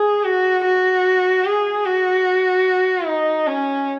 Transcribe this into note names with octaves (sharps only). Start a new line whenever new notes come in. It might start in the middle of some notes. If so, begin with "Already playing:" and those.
Already playing: G#4
F#4
F#4
G#4
F#4
D#4
C#4